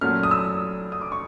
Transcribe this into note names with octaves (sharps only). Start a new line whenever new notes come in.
A#2 F#3 A3 C#4 F6
D#6
E6
D#6
D6
C#6